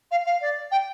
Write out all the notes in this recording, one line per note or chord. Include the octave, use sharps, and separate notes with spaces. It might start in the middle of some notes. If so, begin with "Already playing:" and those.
F5
F5
D5
G5